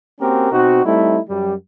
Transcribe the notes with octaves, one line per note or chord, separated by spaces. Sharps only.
A#3 C4 C#4 F#4 G4 A#4
B2 C4 D#4 F#4
G3 A3 C4 D#4 E4
F#2 G3